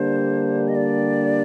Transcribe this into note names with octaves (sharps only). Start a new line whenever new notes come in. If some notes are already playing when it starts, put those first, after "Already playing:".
Already playing: D3 G3 A#3 D4 G4 C5
D#5
D5